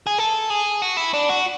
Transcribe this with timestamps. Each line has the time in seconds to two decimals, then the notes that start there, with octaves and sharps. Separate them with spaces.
0.07 G#4
0.19 A4
0.50 G#4
0.82 F#4
0.97 E4
1.14 D4
1.29 F#4